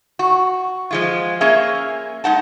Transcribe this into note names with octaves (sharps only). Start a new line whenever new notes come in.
F#4
F3 G#3 F4
A#3 C#4 G#4 E5 F5
G#3 D#4 F#5 A5